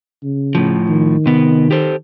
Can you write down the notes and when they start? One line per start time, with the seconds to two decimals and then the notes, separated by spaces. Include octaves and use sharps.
0.23 C#3
0.55 A2 F3
0.88 D#3
1.26 C3 B3
1.71 G4 A4 C5